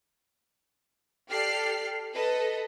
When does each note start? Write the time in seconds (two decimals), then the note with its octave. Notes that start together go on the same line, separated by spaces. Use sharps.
1.29 G4 A4 D5 F6 C7
2.13 A4 B4 D#5